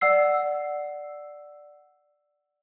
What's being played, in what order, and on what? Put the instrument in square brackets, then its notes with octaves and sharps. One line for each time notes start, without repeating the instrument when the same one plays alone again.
[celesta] D5 F#5 E6 C7